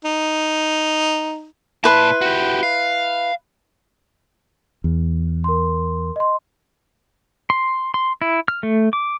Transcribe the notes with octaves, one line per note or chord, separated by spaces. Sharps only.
D#4
A#2 E4 B4 A5 C6
F#4 G4
F5
E2
A#4 C6
D#5 C6
C6
C6
E4
F6
A3
D6